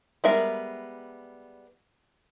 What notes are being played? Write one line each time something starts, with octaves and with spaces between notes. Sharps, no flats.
G3 G#3 B3 A#4 E5